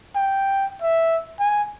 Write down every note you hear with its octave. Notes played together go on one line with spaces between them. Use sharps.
G5
E5
G#5